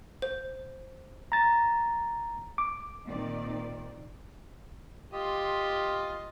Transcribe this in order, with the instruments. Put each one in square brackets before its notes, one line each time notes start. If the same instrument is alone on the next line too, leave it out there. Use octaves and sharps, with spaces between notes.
[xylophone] C5
[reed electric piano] A#5 A6
D6
[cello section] A#2 D#3 C4 D5
[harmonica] F4 G4 [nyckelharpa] D#5 C6